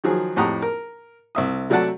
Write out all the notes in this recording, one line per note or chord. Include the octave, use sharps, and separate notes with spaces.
D#3 F3 F#3 G#4
F2 A2 G4 F#5 A#5 D#6
A#4
C2 E5 D#6
C3 F#3 A3 D5 F#5 A5